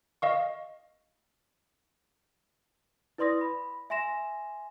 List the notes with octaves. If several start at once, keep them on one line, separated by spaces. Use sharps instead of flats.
D#5 F5 C#6
E4 B4 D5 C6 D#6 A#6
B5
E5 G#5 C6 A#6 E7